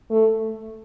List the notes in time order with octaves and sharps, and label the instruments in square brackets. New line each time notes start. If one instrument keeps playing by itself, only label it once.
[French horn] A3